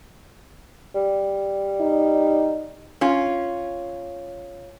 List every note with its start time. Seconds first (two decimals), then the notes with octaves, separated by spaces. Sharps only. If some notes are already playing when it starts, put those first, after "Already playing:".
0.95 G3
1.81 D#4
3.01 C#4 F4